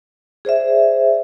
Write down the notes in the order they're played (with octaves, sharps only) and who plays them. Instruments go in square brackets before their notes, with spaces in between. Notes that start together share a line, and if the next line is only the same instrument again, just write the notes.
[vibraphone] G#4 C5 D5 E5